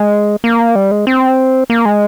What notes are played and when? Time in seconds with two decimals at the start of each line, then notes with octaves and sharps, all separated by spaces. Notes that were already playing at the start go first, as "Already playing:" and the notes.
Already playing: G#3
0.44 A#3
0.75 G3
0.91 G#3
1.07 C4
1.70 A#3
1.85 G#3